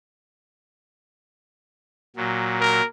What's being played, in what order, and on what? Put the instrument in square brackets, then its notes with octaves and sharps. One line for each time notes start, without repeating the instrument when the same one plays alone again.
[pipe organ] A#2 F#3
[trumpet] A#4